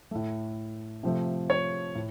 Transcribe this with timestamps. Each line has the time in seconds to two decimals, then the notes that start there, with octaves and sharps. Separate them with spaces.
0.11 A2 A3
1.03 C3 F3 A3
1.50 C#5
1.95 A2